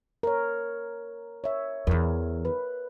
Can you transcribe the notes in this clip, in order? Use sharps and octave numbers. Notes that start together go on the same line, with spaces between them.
A#4 C#5
C#5 E5
E2 E3 A#4
B4